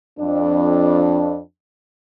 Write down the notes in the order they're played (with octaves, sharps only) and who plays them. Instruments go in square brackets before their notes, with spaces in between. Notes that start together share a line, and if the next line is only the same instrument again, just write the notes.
[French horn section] F2 D4